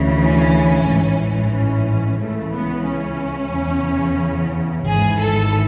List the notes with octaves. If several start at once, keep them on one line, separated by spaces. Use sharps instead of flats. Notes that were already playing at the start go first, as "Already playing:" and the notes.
Already playing: D2 C#3 E3
C#4
A1 G#2 E3
C#4
C#2 C#3 E3 A3
B3
C#4
E2 C#3 E3
G#1 G#2 E3 G#4
A4